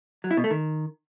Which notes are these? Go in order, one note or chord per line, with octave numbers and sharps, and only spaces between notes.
F#3
E4
B2
A3
D#3